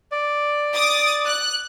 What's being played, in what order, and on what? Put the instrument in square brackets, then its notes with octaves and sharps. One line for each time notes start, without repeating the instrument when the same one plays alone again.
[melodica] D5
[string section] D6 D#6 A6
F#6